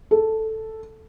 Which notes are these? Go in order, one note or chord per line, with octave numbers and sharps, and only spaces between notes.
A4